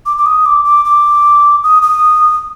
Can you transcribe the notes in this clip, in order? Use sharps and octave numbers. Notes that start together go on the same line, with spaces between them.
D6
D6
D#6
D6
D6
D6
D#6
D#6